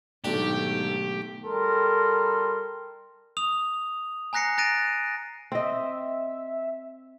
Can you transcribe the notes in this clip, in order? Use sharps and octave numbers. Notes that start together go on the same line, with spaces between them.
B1 G#2 D#3 A3 D4 G4
G3 A4 A#4 C6
D#6 F7
G#5 A#5 F#6 A#6 C7 C#7
A#5 F#6 A6 A#6 D7 D#7
C4 D#5 E5